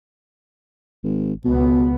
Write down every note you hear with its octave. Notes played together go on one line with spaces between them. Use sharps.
G#1
C#2 B2 B3